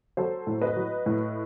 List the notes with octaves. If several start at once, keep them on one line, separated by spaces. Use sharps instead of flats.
F#3 A4 C5
A2
B4 D#5
F#3
A2